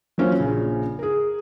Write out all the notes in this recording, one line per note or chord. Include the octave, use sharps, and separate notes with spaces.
F#3 A#3 C#4 F4 F#4 C5
A#1 C#3
G#4 A#4